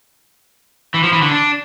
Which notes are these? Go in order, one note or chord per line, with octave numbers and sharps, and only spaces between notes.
E3
F3
E3
D3
D4